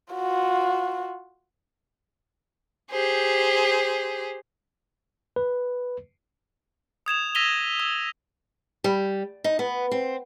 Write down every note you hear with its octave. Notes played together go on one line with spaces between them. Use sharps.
F4 F#4
G4 G#4 C5
B4
D#6 G#6 E7 F7
E6 A#6 B6 D#7 F7 G7
E6
G3
D#4
B3
C4